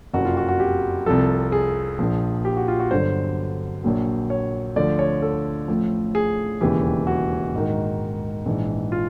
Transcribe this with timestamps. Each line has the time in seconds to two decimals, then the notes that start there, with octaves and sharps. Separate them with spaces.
0.14 F#1 F2 C3 F#4
0.25 F4
0.37 F#4
0.48 F#4
0.60 G4
1.06 C2 C3 F3 A4
1.52 G#4
1.99 A#1 A#2 F3
2.45 G4
2.57 F#4
2.68 F4
2.79 F#4
2.91 G1 G2 D3 F#3 C5
3.84 A#1 A#2 F#3
4.30 C#5
4.76 D2 D3 F3 D5
4.99 C#5
5.22 A4
5.68 A1 A2 F3
6.15 G#4
6.61 E1 D#2 C#3 E3 G4
7.07 F#4
7.53 A#1 G#2 D#3
8.46 A#1 G#2 E3
8.92 F4